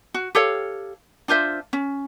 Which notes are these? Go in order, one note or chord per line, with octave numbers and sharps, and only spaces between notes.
F#4
G4 A4 C#5 F5
D4 F4 C5 E5
C#4